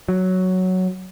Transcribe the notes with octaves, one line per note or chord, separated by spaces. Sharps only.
F#3